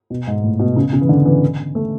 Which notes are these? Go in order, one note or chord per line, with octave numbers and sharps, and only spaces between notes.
B2
G#2
A2
B2
C#3
C#3
E3
D3
E3
A3